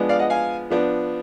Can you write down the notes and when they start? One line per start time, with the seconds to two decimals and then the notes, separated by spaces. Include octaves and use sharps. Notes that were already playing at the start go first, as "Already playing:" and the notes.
Already playing: F3 G#3 B3 D4
0.09 D5 F5
0.19 D#5 F#5
0.30 F5 G#5
0.70 F3 B3 D4